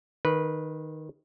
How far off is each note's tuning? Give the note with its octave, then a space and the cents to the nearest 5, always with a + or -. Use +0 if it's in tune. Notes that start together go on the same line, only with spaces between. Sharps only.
D#3 +0 B4 -15